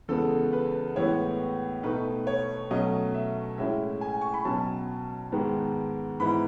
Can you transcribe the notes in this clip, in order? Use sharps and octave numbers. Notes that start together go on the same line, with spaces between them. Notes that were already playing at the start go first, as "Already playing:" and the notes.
E2 C#3 G#3 B3 A4
B4
A2 E3 G#3 B3 C#5
B2 A3 D#4 B4
C#5
B2 F#3 A3 C#4 D#5
E5
A2 G#3 C#4 E4 E5
G#5
C#6
B5
B2 F#3 C#4 A5
G#2 D#3 G#3 B3
G#2 E3 B3 E4 B5